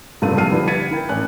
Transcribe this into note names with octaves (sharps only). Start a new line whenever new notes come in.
F#1 C2 G2 F4 A4 D#7
A#1 A5 F6 C7 D#7
D3 F3 G3 E4 B4
G#6 A6 B6 C#7 D#7
E4 A#4 G5
A1 G#5 F#6